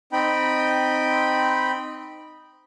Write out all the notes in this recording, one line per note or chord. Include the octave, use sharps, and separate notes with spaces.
C4 D#4 G5 B5